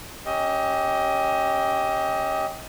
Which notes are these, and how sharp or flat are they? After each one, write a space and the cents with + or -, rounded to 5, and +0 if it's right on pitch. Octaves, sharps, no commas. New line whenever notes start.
C#4 +0 G4 +0 D#5 +25